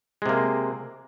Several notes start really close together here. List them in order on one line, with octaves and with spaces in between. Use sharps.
G#3 C3 A#3